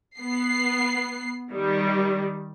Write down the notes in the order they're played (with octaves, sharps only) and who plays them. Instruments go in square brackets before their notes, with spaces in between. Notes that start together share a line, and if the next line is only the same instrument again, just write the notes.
[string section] B3 C7
D#3 G3